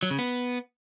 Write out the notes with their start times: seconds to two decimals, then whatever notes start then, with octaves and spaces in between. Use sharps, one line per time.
0.03 F#3
0.11 C#3
0.19 B3